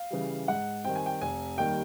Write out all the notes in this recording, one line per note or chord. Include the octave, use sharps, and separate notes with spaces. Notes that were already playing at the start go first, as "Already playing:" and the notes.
Already playing: F5
C#3 E3 G3
G#2 F#5
D#3 G3 C4 G5
G#5
G5
F1 G#5
D#2 D#3 G3 G5